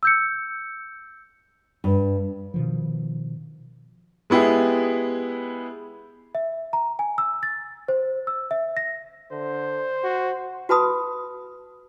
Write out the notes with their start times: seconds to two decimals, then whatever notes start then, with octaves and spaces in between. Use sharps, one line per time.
0.03 E6 G6 C#7
1.84 G2
2.54 B2 D#3 F3
4.30 G#3 B3 E4 G4 G#4
6.35 E5
6.73 A#5
6.99 G#5
7.18 E6
7.43 A6
7.88 C5
8.27 E6
8.51 E5
8.77 A#6
9.32 D3 C5
10.04 F#4
10.69 F#4 B4 A5 B5 D#6